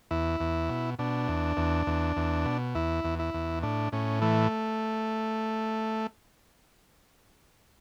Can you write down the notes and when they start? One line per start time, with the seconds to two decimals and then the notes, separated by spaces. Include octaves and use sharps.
0.11 E2 E4
0.40 E2
0.69 B2
0.99 B2 D4
1.28 E2
1.57 E2
1.87 E2
2.17 E2
2.45 B2
2.75 E2 E4
3.04 E2
3.19 E4
3.34 E2
3.63 A2 D4
3.92 A2 C#4
4.22 E3 A3